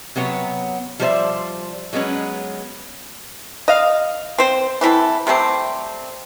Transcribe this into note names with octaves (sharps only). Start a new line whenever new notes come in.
C3 F#3 B3 C#5
F3 G3 A4 C5 D5 E5
F#3 G#3 B3 C#4 B4
D#5 F5
C4 C5
E3 C4 E4 A4
C3 G3 A3 C4